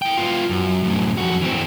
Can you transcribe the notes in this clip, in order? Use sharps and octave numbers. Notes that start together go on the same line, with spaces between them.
E4 G5
B3 F4
F#2
F#2 A2
F2 F#4
E3 C4